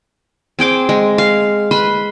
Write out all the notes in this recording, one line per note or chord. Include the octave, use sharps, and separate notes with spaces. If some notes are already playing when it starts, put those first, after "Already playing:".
C4 G#4 G5 D6
G#3
F5
B4 B5 C6